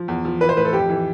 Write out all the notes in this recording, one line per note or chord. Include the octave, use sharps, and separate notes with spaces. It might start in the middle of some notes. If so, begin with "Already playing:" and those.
Already playing: F3
E2
F3
E3 B4
C5
A2 B4
A4
F2 G4
E3